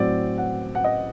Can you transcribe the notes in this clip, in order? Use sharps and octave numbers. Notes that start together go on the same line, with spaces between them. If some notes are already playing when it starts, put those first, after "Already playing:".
Already playing: A2 F#3 C4 D5
F#5
F#5
D#5